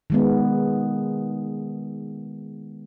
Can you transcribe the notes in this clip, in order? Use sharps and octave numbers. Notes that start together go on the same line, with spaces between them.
D#3 G#3 B3